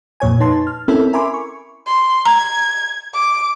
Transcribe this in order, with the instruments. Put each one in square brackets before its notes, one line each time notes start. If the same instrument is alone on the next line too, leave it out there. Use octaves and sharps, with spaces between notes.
[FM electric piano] F2 A#2 C#5 G#5
D#4 B4 A5 C6
F6
C4 C#4 E4 A4 A#4 E5
A#4 E5 G#5 B5 C6 D6
C#6
[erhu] C6
[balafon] A#5 [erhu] G#6
[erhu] D6